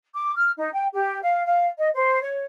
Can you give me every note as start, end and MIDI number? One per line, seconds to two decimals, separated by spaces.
0.15 0.32 86
0.37 0.50 89
0.57 0.70 63
0.72 0.86 79
0.93 1.21 67
1.21 1.43 77
1.44 1.65 77
1.78 1.89 75
1.94 2.21 72
2.21 2.44 73